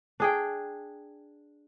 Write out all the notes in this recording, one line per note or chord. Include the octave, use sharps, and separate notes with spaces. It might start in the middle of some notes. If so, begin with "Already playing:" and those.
D4 G#4 G5